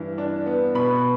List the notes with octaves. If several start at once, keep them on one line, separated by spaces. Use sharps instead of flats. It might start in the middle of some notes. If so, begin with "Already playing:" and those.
Already playing: G2 E3
D4
B3
B2 B5